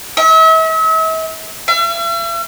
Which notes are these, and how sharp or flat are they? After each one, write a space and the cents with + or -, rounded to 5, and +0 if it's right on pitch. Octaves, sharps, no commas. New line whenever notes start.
E5 -40
E5 +45